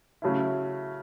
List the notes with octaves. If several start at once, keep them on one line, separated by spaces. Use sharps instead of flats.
C#3 F#3 A3 E4